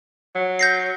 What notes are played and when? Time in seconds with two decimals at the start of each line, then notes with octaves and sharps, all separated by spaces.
0.35 F#3
0.59 G6 A#6 C7